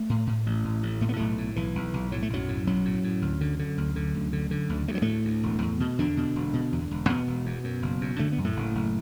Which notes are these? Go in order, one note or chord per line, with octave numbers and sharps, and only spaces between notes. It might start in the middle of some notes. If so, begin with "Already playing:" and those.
Already playing: A3
A2
A2
A1
A2
A1
A2 A3
B3
B1 A2 A3
A2
B1 E3
B1
B1
A2 F#3
A3
B1 F#2 F#3
A2
B1 F#2 F#3
A2
A2
D2
D3
D3
D2
D3
D2
D3
D3
D2
D2 A3
F#3
D2 A2 A3
D2
E1
E2
B2
E2 D3 D4
B2
E1
B2
E2
E1
E2 B2 B3
E1
E2
F#2
F#1
F#2
D3 A3
B3
F#2
A2 A3
F#1
F#1